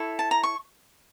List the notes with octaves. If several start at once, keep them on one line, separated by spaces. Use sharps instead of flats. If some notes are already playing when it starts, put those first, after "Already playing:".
Already playing: E4 A4 C#5
A5
A#5
C#6